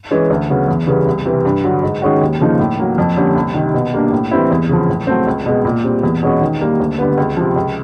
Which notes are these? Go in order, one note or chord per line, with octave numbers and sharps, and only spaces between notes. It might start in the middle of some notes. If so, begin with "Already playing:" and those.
E3 G#3 C#4
D2
C#3 F#3 B3
E2
C#3 E3 G3 B3
C2
C3 E3
G2
D3 F#3
G#2
D#3 G#3 C#4 F#4
D#2
C#3 F3 A#3 D#4
A2
F#3 A#3
F2
D3 G3 A#3 C#4
C2
C3 D#3
B2
G3 A#3 D4
A2
E3 G3 C4 E4
E2
C#3 F3
A2
F#3 A3 C4
C#2
B2 G#3
A#2
G3 C4
E2
B2 G#3 C#4 F#4
D#3
G3 A#3
D2
D3 G3 B3
C#2
C3 F3
C#2